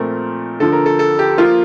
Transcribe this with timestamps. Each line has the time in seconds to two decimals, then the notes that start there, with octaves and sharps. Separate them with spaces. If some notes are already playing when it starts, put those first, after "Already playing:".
Already playing: A#2 F3 A3 C4 A#4
0.60 D2 D3 F3 A4
0.72 A#4
0.86 A4
0.99 A4
1.19 G4
1.38 F3 A#3 F4